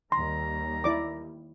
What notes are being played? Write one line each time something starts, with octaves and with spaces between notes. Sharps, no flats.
D#2 D#3 G3 A#5 C6
E4 D5 D6